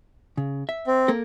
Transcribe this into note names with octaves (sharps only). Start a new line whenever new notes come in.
C#3
E5
C4
A#3 A4 A#4